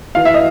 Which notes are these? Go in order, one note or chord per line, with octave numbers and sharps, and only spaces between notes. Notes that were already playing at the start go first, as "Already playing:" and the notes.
E3 F5
E5
D#5